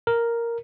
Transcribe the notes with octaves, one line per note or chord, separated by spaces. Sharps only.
A#4